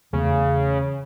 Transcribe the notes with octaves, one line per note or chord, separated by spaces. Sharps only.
E2 C#3 A3 C4